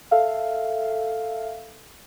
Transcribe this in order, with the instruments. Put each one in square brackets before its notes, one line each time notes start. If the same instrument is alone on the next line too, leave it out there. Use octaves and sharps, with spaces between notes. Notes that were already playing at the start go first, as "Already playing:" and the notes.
[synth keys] A4 E5 F5